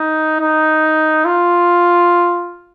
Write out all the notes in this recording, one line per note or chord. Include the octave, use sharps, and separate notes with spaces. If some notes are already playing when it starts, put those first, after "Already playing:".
Already playing: D#4
D#4
F4